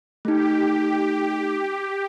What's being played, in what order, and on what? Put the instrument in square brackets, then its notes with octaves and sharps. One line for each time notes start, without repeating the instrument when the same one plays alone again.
[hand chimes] A3 D#4 [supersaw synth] G4